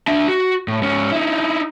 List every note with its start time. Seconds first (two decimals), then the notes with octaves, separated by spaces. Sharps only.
0.08 D4 E5
0.28 F#4
0.68 A2
0.82 G#2 C#4
1.12 D#4 E4